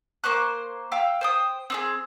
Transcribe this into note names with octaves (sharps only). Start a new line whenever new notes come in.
A#3 C5 C#6 F#6
F5 G5 E6
C5 G5 D#6
C4 D#4 G#4